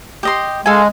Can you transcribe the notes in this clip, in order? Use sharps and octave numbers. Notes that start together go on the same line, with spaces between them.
G4 D#5 C6
G#3 A4 F5 G#5